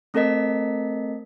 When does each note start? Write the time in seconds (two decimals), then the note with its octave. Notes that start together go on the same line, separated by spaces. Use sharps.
0.14 A3 C4 A4 A#4 D#5 B6